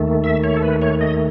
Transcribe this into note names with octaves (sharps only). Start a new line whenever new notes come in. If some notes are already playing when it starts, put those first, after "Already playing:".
Already playing: D#2 D#3 A3
E5
C#5
A4
B4
C#5
D#5